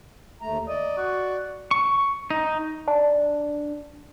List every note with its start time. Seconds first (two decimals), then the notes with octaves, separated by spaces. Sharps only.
0.41 D#2 A3 A#5
0.68 D5 D#5
0.97 F#4
1.71 C#6
2.30 D#4
2.88 D4